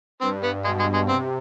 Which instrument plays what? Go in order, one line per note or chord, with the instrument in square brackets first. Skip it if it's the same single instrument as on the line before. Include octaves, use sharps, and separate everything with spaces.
[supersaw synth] G2 [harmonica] C4
[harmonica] B3
[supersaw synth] B2 [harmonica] G#3
[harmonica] G#3
G#3
[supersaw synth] C3 [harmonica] C4